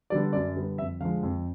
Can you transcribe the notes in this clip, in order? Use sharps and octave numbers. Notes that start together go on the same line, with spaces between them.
D3 G3 B3 D5
F#2 D5
D3 G3 B3
F2 E5
D3 F3 G#3 F5
F2